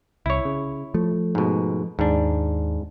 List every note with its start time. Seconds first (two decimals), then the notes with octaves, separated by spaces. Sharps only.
0.26 C2 E4 C#5
0.45 C#3
0.94 F3 A3
1.35 G#2 B2
1.99 D#2 G#2 D4